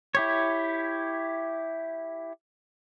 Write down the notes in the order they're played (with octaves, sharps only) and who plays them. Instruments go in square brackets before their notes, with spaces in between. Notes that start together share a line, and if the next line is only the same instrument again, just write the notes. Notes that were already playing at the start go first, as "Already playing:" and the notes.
[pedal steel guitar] E4 G4 C#5